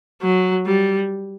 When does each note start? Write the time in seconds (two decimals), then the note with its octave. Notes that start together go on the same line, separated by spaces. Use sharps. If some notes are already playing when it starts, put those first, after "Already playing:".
0.22 F#3
0.67 G3